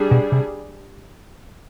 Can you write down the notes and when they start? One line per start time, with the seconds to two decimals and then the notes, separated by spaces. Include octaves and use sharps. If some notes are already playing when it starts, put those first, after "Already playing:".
Already playing: G3 D4 G#4
0.11 B2
0.32 C3